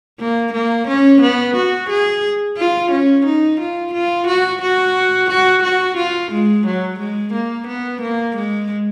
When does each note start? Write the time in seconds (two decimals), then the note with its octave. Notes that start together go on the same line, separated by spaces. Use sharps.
0.20 A#3
0.53 A#3
0.88 C#4
1.22 B3
1.56 F#4
1.90 G#4
2.57 F4
2.92 C#4
3.26 D#4
3.60 F4
3.93 F4
4.27 F#4
4.62 F#4
5.30 F#4
5.63 F#4
5.97 F4
6.32 G#3
6.66 F#3
7.00 G#3
7.33 A#3
7.68 B3
8.02 A#3
8.36 G#3